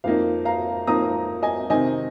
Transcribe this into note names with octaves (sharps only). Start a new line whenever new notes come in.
F2 F3 A#3 D#4 F5
F5 A#5
F2 F3 A#3 D#4 A#5 D#6
D#5 G#5
C3 D#3 C4 D#4 D#5 G#5